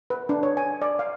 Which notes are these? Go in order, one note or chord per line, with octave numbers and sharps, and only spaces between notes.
B4
D4
C#5
G#5
D5
F5